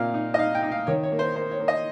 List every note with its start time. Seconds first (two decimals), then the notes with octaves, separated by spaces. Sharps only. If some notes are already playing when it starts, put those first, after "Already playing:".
Already playing: A#2 C4 D#4 F5
0.14 D#4
0.34 D#5
0.38 D#4 F5
0.55 G5
0.63 D#4
0.71 F5
0.87 D#3 C#5
1.03 C#5
1.12 A#3
1.19 C5
1.35 A#3 C5
1.51 C#5
1.60 A#3
1.68 D#5